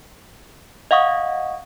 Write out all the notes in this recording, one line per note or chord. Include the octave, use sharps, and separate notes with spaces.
D#5 F5 F#5 C#6 D#6